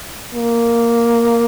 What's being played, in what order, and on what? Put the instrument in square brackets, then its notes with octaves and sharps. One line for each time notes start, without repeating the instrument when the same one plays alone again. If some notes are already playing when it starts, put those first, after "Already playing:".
[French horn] A#3